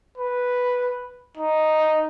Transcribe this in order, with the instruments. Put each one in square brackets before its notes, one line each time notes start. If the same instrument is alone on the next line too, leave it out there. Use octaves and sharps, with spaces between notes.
[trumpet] B4
D#4